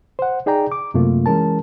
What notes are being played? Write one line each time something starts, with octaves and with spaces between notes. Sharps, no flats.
C5 F#5
D#4 G#4 D5 G5 A#5
D6
F#2 C3 A3 A#3 F4
E3 G#3 C#4 A#4 A5